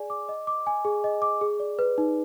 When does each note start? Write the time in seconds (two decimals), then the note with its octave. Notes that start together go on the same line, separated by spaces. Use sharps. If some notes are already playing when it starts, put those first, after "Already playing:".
Already playing: G#4 D5 G#5
0.10 D6
0.29 D#5
0.47 D6
0.67 G#5
0.85 G#4
1.04 D#5
1.22 D6
1.41 G#4
1.60 D5
1.79 B4
1.98 D#4